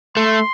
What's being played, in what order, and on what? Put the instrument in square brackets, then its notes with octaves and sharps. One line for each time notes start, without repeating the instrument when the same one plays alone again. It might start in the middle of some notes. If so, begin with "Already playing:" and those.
[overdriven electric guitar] A3 [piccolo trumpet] C6